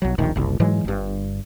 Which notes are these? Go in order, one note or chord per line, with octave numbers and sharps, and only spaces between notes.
B1 F#3
D1 A#1 D#3
F#1 C2
G#2 E3 F#3 G#3
G1 G2